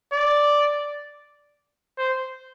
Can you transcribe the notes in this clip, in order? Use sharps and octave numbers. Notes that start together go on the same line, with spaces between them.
D5
C5